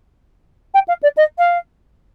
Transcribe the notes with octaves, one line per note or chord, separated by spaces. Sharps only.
G5
F5
D5
D#5
F5